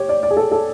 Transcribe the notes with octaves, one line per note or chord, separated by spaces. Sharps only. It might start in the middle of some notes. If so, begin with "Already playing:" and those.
Already playing: G4 C#5
D5
D5
G#4
A4
A4